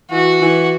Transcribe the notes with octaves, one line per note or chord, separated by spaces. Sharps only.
E3 F#4
E3